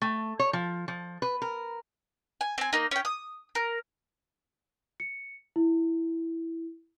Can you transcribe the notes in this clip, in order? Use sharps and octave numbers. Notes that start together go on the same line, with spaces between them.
A3
C#5
F3
F3
B4
A#4
G#5
C4 G#5
A#3 D#4
C#4 G5
D#6
A#4
C#7
E4